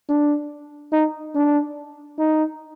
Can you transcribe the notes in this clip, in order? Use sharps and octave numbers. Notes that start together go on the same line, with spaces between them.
D4
D#4
D4
D#4